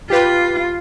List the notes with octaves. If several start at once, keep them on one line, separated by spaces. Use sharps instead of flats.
F4 G4 B4